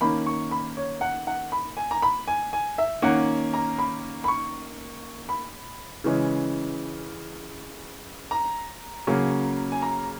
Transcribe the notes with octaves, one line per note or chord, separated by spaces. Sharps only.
D#3 A#3 C#4 B5
C#6
B5
C#5
F#5
F#5
B5
G#5
A#5
B5
G#5
G#5
E5
D#3 A#3 C#4 F#5
A#5
B5
B5
C#6
B5
C#3 E3 G#3 C#4
A#5
C#3 F#3 A#3 C#4
G#5
A#5